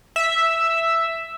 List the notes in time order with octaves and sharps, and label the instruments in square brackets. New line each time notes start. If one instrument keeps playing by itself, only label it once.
[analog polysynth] E5